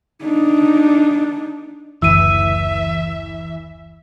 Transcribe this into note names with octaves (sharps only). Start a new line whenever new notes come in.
D4 D#4
F#1 D2 E3 E5 E6 D#7